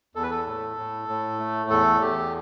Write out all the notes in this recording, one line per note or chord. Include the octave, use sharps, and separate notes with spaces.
E2 A4
B4
A4
A2
A2
A2
A3
E2 A4
E2 G4